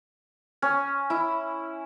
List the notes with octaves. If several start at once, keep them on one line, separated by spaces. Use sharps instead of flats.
C#4
E4